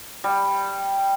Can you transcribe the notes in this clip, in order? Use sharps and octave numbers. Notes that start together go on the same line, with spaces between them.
G3